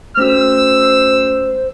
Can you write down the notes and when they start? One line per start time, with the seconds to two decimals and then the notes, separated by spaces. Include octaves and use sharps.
0.17 A3 C#4 F#4 C5 E6